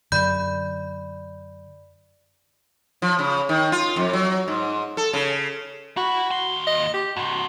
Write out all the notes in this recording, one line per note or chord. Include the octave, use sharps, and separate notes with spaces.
F#2 D3 D5 B5 G6
F3
C#3
D#3
F4
F2
F#3
G#2
A4
C#3
E4 F#4 B5
D#2 C6
D#5
G4
G2 C3 F#4